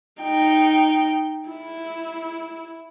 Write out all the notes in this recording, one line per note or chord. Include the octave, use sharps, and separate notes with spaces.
D#4 G5
E4